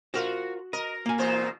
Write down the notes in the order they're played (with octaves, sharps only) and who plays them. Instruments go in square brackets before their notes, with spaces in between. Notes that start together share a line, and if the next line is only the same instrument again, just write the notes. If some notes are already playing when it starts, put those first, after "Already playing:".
[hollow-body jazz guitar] F4 A#4 C5 [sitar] F#4
[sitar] A#4 [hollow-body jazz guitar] D#5
[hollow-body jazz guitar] A#3 G#5
[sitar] E2 B2 C5